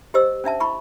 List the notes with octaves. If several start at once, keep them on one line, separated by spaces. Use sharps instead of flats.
G4 C5 D#5 E6
C#4 D4 E5 A5
E4 B5 C#6